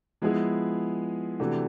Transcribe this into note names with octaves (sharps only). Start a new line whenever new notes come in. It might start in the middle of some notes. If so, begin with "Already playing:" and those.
F3 G#3 B3 E4 G#4
C3 E3 A3 D4 F#4